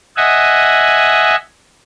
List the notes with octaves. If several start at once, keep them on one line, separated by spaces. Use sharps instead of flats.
D#5 E5 F#5 G#5